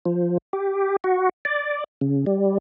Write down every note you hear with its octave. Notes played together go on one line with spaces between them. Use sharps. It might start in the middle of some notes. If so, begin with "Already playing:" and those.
F3
G4
F#4
D5
C#3
G3